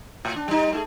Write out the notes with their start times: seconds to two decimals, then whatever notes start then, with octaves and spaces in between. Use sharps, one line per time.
0.25 A2
0.36 D4
0.48 G3 D#4
0.72 A3 E4 G#4